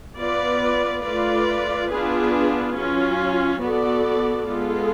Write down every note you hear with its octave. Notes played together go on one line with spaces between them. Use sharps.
B3 F4 B4 D5
A3 F4 B4 D5
B3 D4 F4 G#4 B4
F#3 C#4 F4
B3 F#4 A4 D5
G#3 B3 F4 A4